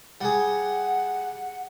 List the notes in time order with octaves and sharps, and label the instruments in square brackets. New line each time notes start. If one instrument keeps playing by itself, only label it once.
[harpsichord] G3 G#4 [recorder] F#5